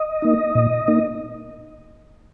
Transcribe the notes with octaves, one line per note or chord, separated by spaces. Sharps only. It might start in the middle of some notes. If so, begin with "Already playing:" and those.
Already playing: D#5
A#3 D#4
A#2
A#3 D#4